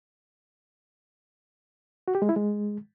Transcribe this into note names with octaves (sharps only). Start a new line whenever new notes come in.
F#4
G4
G#3
E4
G#3